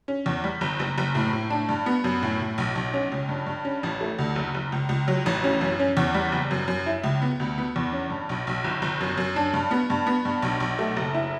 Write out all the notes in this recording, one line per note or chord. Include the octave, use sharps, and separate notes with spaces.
C#4
E2
G3
G1
F#1
F#1
A2
A2
D4
G2
B3
F#2
A2
A2
B1
B1
C#4
C#2
G2
G2
C#4
A1
A3
D2
F#1
F#1
C#2
C#2
F#3
A1
C#4
F#2
C#4
E2
G3
F#1
F#2
F#2
E4
C#2
B3
D2
B3
E2
C#4
G2
B1
B1
G1
G1
F#2
F#2
D4
G2
B3
G2
B3
G2
B1
B1
A3
F#1
E4